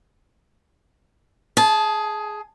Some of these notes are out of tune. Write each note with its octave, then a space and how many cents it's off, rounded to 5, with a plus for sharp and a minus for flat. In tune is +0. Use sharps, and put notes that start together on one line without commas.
G#4 +10 A5 -20